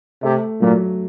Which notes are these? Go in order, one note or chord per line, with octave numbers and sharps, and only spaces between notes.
C3 A3
A#2 F#3